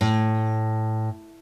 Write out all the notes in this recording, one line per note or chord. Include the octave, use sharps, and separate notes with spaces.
A2